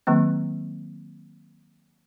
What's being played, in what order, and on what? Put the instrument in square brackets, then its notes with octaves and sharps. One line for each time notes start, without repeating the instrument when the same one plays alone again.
[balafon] D#3 F#3 A#3 C4